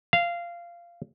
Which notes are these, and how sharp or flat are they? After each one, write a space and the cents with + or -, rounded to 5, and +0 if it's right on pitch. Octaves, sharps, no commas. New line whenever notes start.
F5 -15